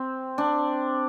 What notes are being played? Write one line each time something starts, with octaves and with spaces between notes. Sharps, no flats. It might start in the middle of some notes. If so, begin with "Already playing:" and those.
Already playing: C4
D4